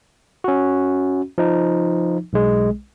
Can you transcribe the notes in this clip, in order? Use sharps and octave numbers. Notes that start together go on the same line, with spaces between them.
C#4 F#4
F3 D#4
B1 G#3